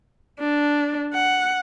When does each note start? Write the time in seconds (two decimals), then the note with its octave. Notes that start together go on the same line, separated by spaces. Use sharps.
0.39 D4
1.13 F#5